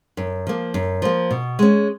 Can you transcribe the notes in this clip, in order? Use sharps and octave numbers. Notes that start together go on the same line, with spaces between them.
F#2
F3 A#3
F#2
F3 A#3
B2
G#3 C#4